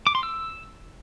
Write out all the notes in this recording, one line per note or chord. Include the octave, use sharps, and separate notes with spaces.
D6
C6
E6